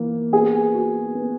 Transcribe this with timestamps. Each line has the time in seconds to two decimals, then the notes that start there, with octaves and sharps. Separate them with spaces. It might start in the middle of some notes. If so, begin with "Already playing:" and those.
Already playing: E3 A#3
0.33 B3 G#4
0.74 F#4
1.15 B3